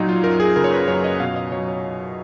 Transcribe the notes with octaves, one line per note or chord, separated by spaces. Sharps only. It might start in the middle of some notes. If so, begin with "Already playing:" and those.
Already playing: A#2 F#3 D#4
F4
F#2 A#4
G#4
C#3 A#4
C#5
B4
F#2 C#5
D#5
B2 F5
D#5
F#3 C#5
C#5